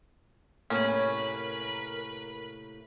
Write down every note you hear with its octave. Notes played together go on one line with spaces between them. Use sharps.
A2 C3 A#3 C#4 A#4 B4 B5